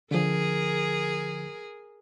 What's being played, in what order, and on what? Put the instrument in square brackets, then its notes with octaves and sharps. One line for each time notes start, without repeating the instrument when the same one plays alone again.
[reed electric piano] D3 F3 [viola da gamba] G#4 A#4